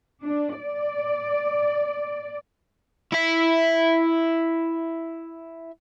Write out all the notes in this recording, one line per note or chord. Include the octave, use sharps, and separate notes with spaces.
D4
D5
E4 E5